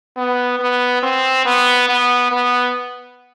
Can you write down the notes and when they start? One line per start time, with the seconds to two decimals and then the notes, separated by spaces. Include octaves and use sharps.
0.17 B3
0.60 B3
1.03 C4
1.45 B3
1.89 B3
2.32 B3